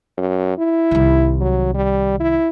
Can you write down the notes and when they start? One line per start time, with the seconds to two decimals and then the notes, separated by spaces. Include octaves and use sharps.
0.18 F#2
0.58 E4
0.91 C2 D#3
1.41 F#3
1.75 G3
2.20 E4